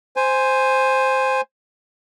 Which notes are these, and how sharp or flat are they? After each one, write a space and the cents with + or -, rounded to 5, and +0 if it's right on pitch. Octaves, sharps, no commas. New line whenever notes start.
C5 +0 G#5 -5